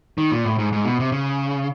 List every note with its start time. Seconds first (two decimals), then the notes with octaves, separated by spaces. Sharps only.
0.18 D#3
0.31 A#2
0.45 A2
0.59 G#2
0.73 G#2
0.85 B2
1.00 C3
1.12 C#3